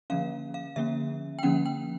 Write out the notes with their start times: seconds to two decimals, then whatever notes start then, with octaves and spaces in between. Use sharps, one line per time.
0.10 D3 F3 A#3 C#4 F5
0.54 F5
0.76 D3 F3 A#3 C#4 E5
1.39 G5
1.43 D3 F3 A#3 C#4 F#5
1.66 G5